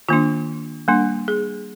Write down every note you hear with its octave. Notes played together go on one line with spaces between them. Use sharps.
D#3 A#3 D4 F4
G3 A#3 D4
G#4